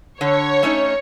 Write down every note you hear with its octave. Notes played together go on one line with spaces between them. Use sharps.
D3 C#5
A3 C#4 D#4